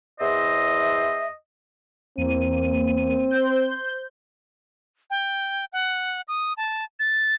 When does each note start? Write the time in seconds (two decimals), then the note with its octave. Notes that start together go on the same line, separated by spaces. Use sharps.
0.20 E2 C5 D#5 E5
2.18 E2 A#3 C4 D#7
3.30 C5 G6
5.10 G5
5.73 F#5
6.28 D#6
6.57 A5
7.00 A6